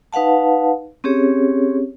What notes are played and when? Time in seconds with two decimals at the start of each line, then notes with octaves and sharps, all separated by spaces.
0.13 D#4 B4 F5 F#5 A5
1.04 C4 C#4 G4 G#4 C#5